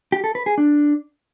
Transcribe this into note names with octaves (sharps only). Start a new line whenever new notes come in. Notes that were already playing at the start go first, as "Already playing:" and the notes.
G4
A4
B4
G#4
D4